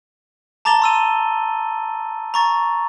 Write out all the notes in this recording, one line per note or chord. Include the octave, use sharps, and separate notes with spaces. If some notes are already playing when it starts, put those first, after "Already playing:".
A5 A#5 D6 A6 F7 G7
C6 E6 D#7
A#5 C#6 A6